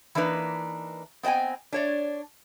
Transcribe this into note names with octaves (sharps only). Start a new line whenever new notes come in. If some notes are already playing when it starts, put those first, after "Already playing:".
E3 A#3 D4 D#4 B4
B3 C4 D#5 G5 G#5
D4 C#5 D5